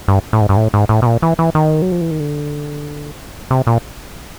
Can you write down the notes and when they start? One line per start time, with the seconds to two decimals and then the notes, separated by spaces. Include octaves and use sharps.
0.08 G2
0.33 A2
0.41 G#2
0.49 G2
0.57 A2
0.74 G#2
0.89 A2
1.02 B2
1.06 A#2
1.22 E3
1.39 E3
1.55 D#3
1.82 F#3
1.92 F3
2.01 E3
2.11 D#3
2.20 D3
3.51 C3
3.67 A#2